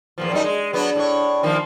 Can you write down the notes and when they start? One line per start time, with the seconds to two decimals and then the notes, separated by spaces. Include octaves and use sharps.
0.18 E2 A#2 F3
0.32 F#2 G3 D#4
0.44 G#3
0.73 F#3 B3 D4
0.95 A2 D4 C#5
1.43 D#3 F3 A#3